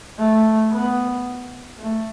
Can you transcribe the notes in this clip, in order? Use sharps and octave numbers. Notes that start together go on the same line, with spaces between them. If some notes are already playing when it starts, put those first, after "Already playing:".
A3
B3
A3